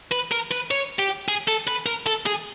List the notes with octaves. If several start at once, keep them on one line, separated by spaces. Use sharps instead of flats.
B4
A#4
B4
C#5
G4
G#4
A4
B4
A#4
A4
G#4